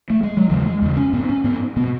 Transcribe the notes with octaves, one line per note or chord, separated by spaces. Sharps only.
A3
G#3
F#3
E2 C#3 E3
G#3
E2 C#3
C#4
G#2 B3
C#4
G#2 B3
B2 B3